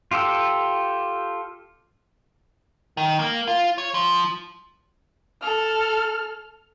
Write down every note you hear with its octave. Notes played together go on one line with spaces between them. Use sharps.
F4 G4 A4 E6
D#3
A#3
F4
C#5
F3
A4 F6